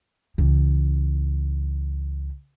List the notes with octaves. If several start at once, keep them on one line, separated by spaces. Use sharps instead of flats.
C#2 E3